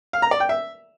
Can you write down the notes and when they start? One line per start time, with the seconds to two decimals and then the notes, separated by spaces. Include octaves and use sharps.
0.13 F5
0.22 A#5
0.31 D5
0.40 G5
0.49 E5